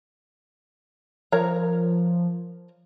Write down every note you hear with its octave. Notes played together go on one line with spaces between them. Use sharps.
F3 A#4 C#5 A#5